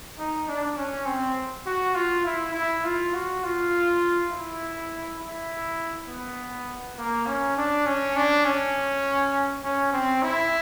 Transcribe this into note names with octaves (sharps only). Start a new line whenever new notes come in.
D#4
D4
C#4
C4
F#4
F4
E4
E4
F4
F#4
F4
E4
E4
B3
A#3
C#4
D4
C#4
D4
C#4
C#4
C4
E4